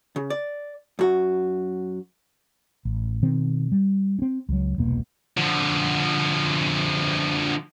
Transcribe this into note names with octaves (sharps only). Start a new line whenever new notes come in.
C#3
D5
F#2 F#4
A1
B2 D#3 C4
G3
C4 C#4
C#2 F#3
E1 C2 B2 A#3
D3 F3